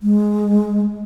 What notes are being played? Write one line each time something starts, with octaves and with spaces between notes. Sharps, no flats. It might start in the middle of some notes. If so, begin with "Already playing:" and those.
G#3